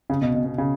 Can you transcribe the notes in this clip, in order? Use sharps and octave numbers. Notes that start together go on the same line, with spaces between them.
C#3
B2
B2
B2
C#3